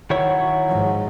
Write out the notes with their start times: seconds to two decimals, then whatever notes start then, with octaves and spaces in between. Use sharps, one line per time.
0.10 D#3 F#3 E4 C#5
0.67 G#2 F3